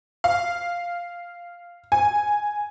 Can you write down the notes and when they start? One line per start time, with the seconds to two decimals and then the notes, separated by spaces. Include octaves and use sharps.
0.24 F5
1.92 G#5